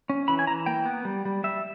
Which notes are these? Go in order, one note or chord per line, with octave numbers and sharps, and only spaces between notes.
C#4
E3 B5
G#5
E3 A#5
A#3 G5
B3
G3
G3
G3 E5